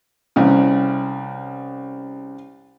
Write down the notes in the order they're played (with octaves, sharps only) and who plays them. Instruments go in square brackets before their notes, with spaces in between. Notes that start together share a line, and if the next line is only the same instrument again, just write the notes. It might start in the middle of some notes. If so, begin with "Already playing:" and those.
[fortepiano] C2 C#3